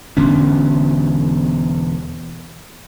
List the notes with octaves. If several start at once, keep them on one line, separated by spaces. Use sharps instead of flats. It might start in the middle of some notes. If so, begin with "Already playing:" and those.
E1 D3 B3 C#4